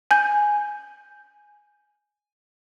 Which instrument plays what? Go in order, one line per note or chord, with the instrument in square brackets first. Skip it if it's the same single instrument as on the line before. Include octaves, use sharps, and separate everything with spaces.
[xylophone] G#5 G6